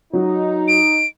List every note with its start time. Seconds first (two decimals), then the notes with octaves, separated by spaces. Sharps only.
0.13 F#3 D#4
0.68 D7